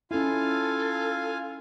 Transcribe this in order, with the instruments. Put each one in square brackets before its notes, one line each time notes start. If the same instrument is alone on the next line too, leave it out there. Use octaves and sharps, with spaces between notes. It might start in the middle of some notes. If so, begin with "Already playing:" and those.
[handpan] C#4 E4 [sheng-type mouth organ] F4 F5 G#5 [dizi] A4